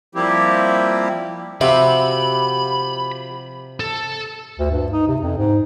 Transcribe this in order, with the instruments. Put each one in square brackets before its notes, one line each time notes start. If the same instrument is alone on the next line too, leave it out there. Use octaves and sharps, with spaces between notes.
[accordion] F3 G3 A#3 C4 E4 G4
[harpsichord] C3 [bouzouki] F3 F#4 G4 [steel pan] E5 [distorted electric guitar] B5
[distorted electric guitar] A4
[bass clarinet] D2
G2
D#4
C3
F2
G#2